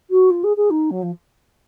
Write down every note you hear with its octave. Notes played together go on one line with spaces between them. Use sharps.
F#4
F4
G#4
G#4
D#4
F#3
F3